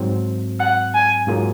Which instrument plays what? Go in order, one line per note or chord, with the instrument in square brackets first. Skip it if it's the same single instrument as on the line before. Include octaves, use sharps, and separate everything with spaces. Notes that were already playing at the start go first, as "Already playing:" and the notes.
Already playing: [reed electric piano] G#2 F#3 C4
[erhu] F#5
G#5
[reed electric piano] G#2 F#3 A#3 F4 G#4